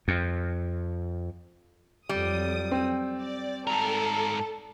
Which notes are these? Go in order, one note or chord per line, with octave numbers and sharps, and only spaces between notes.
F2
F2 F#3 G3 D#6
C4
D5
G#2 A4 A#4